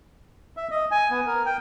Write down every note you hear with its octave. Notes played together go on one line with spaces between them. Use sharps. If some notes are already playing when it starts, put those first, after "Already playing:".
E5
D#5
G#5
B3
A#4
G5